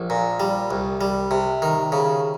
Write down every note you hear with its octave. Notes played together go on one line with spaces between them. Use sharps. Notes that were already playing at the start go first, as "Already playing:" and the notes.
Already playing: A#1
A#2
G3
C2
G3
C3
D#3
C#3